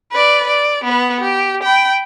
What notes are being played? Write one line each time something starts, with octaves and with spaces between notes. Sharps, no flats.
B4 D5
D5
B3 B4
G4
G5 B5